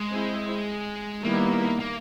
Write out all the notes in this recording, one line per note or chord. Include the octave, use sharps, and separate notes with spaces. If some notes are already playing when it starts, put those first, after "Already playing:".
Already playing: G#3
C4 E4 G#4 C5
D#3 G3 A#3 B3 E4
A#3